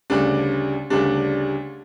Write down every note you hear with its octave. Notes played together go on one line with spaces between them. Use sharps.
D2 C#3 G3 D4
D2 C#3 G3 D4